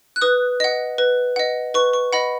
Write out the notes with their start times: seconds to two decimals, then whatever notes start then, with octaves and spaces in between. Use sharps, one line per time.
0.16 F#6
0.21 B4 D#6
0.60 D#5 F#5
0.98 B4
1.36 D#5 F#5
1.74 B4 C#6
1.93 C#6
2.13 D#5 F#5 B5